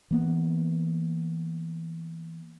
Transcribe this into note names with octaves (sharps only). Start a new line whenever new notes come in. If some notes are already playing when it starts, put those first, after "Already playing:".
E3 A#3 B3